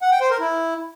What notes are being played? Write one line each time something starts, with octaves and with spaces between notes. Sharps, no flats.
F#5
G5
C5
A#4
E4